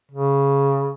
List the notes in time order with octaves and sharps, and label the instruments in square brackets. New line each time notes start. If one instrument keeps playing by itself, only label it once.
[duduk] C#3